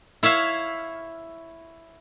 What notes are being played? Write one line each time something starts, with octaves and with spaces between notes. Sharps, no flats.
E4 C#5 E5 F5